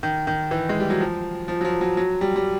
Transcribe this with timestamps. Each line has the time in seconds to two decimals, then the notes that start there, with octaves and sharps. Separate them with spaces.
0.03 D#3
0.27 D#3
0.51 E3
0.69 G#3
0.80 G3
0.90 F#3
1.00 F3
1.48 F3
1.61 F#3
1.65 F3
1.81 F#3
1.97 F#3
2.21 G3
2.36 G3